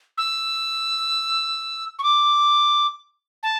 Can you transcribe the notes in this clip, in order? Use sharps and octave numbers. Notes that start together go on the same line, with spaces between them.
E6
C#6
D6
A5